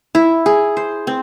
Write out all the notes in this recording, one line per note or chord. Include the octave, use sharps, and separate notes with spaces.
E4
G#4
C5
C4